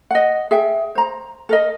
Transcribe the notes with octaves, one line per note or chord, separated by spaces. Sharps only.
D#5 F#5
G#4 E5 G5
C5 A#5
A4 A#4 D#5